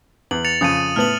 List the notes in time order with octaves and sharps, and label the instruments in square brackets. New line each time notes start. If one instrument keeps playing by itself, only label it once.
[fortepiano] E2 [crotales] F#7
[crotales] A6 C#7 F7
[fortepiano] F2 C#3 [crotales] D#6 A6 D#7
[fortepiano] A2 B3 [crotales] F6 F#7